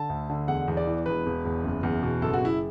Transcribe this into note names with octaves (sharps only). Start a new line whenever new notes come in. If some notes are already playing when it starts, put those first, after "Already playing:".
Already playing: D3 A5
D2
D3
E1 F#5
E2
D5
E3
E1 B4
E1
E2
F#1
E2
B2
F#1 A4
F#4
F#1 E4